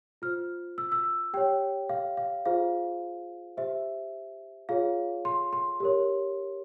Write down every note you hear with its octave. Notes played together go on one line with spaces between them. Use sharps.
F4 C5 F6
E6
E6
G4 C#5 G5
F5
F5
F4 G#4 C5 F5
G4 C5 E5
F4 G#4 C#5 F5
C6
C6
G4 A#4 C#5